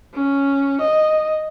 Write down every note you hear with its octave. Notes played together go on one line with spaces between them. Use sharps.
C#4
D#5